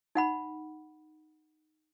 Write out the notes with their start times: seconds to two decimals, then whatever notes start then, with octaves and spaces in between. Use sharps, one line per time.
0.15 D#4 F#5 B5